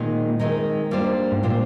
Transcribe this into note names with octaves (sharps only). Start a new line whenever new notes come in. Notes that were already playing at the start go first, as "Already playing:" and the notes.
Already playing: A#2 D#3 G#3 C4 D#4 A#4
D#3 G#3 C4 D#4 A#4
G3 A#3 D4 F4 C5
G#2
A#2 G3 A#3 D4 F4 C5